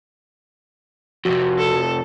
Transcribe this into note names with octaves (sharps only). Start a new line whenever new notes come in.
F2 C3 F#4
A4